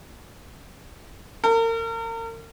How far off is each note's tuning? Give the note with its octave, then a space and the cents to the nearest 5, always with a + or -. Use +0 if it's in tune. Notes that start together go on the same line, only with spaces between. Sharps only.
A#4 -35